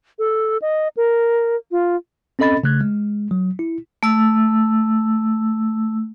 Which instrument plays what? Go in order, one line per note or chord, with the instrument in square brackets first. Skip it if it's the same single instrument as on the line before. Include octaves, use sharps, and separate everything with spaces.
[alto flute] A4
D#5
A#4
F4
[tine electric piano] C4 C#4 A4 D#5 B5 A6
C#3 A3 F#6 G#6
G#3
F#3
E4
[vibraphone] A3 E6